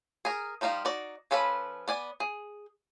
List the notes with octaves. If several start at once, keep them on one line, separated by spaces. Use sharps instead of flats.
G#4 A#4
F3 G3 D#4 F4 G4
D#4 F#4 D5
F3 C#4 A4 B4 B5
B3 D5 G#5
G#4